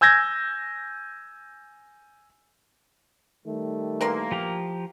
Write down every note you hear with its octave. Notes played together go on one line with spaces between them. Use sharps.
G#5 E6 G6 G#6 A#6
D#3 G3 A3
E3 A#3 A#4 C6
F3 G4 A#5